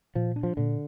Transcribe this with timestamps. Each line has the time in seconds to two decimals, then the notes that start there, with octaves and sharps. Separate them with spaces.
0.15 A#2 F3
0.36 D4
0.43 F3
0.57 A#2 D3